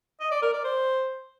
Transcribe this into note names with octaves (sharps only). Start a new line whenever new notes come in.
D#5
D5
A#4
D5
C5